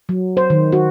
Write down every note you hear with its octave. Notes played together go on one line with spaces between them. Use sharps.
F#3
C5
D#3
F#4